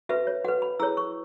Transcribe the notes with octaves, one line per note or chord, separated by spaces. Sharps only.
F#4 B4 E5
C#5
F#4 B4 F#5
B5
E4 G#4 C#5 E6
C#6